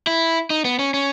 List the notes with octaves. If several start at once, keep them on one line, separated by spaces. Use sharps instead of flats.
E4
D#4
B3
C#4
C#4